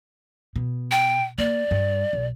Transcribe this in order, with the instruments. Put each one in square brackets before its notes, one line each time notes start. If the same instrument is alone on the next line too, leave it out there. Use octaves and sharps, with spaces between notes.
[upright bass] B2
[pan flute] G5
[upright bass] A#3 [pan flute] D5
[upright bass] G2
B1